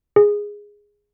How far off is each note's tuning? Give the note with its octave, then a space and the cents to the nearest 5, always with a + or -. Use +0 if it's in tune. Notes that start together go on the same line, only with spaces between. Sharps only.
G#4 -10